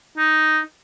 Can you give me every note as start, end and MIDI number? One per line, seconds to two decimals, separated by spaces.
0.18 0.60 63